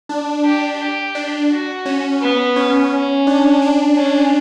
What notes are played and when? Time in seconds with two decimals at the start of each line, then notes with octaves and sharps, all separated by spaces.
0.09 D4
0.44 G4
0.79 G4
1.15 D4
1.51 F#4
1.85 C#4
2.21 B3
2.56 C#4
2.92 C#4
3.27 D4
3.62 D4
3.97 C#4